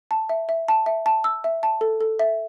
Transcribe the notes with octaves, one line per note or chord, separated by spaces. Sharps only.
A5
E5
E5
A5
E5
A5
E6
E5
A5
A4
A4
E5